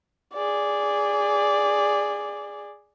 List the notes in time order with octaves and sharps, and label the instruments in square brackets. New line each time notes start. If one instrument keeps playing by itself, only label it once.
[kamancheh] G#4 D5